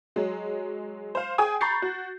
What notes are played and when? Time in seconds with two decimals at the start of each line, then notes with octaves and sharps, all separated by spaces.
0.16 F#3 G#3
1.15 C5 F5
1.38 G#4 G5 G#5 D#6
1.61 A#5 B5 C#6 G6 A6 C7
1.82 F#4